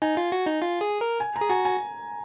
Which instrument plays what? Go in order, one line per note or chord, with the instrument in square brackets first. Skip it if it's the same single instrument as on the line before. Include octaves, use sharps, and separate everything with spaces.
[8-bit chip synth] D#4 [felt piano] G#5
[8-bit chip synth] F4
F#4
D#4
F4
G#4
A#4
[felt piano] G#5
A#5
[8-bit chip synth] G#4
[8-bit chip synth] F#4 [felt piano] G#5
[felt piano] G#5